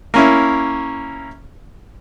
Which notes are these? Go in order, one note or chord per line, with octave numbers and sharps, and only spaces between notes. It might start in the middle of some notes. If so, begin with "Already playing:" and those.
A#3 C#4 E4